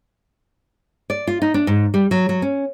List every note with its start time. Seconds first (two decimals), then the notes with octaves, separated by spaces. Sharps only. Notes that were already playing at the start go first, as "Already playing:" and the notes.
1.10 D5
1.27 F4
1.42 D#4
1.54 D4
1.67 G#2
1.94 G3
2.11 F#3
2.29 F#3
2.42 C#4